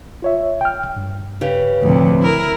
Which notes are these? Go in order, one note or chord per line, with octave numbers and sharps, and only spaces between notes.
F4 C#5 E5
G5 F6
G2
C#3 G4 B4
D2 A2 C3 F3
E4 A#4